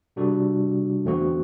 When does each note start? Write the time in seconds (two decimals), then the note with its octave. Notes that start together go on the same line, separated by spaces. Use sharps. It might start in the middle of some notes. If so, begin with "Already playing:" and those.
0.16 C3 G3 D4 F#4 A4
1.05 E2 D3 A3 C4 F#4